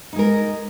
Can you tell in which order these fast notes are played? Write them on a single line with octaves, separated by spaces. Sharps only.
D#4 G#3 A#4